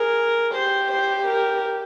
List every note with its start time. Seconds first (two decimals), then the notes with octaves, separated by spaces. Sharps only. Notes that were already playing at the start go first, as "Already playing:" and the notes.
Already playing: G#4 A#4
0.54 G4 C5
0.91 C5
1.28 A#4